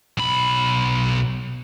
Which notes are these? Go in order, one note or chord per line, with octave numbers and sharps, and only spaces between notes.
B1 B5